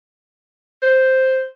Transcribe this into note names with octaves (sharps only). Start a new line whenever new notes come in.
C5